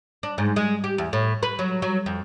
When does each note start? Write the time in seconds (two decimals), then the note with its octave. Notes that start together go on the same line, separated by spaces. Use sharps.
0.23 D4
0.38 G#2
0.56 G#3
0.84 G4
0.98 E2
1.13 A2
1.43 B4
1.59 F#3
1.82 F#3
2.06 F2